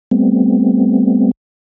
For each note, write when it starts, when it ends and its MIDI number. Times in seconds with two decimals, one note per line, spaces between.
0.11 1.31 55
0.11 1.31 57
0.11 1.31 59
0.11 1.31 60